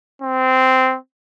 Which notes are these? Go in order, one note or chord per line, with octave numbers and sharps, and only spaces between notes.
C4